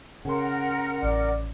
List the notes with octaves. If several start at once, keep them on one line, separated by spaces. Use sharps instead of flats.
C#3 C#4 A#4 F#5 C6
A1 D5